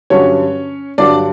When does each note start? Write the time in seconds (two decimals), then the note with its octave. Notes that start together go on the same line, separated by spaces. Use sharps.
0.10 G2 D3 F#3 C#4 C#5
0.98 G2 D3 F#3 D4 D5